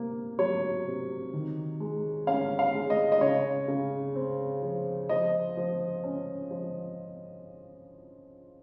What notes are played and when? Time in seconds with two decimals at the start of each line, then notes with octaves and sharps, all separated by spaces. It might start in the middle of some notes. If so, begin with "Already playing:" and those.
Already playing: C3 A#3
0.39 F#3 C#5
0.86 C3
1.33 D#3
1.80 G#3
2.27 C#4 F5
2.59 F5
2.74 G#3
2.90 D#5
3.12 D#5
3.21 C#3 C#5
3.68 C#3
4.15 C4
4.62 F3
5.09 F3 D#5
5.57 F3
6.04 C#4
6.51 F3